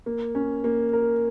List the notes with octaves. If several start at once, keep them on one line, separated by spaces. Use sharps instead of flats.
A#3
C#4
A#3
A#4